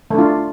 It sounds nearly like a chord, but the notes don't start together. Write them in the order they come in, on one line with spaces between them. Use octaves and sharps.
A3 D4 F4